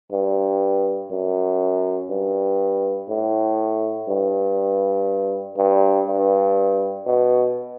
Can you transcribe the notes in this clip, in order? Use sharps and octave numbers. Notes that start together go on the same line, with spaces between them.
G2
F#2
G2
A2
G2
G2
G2
B2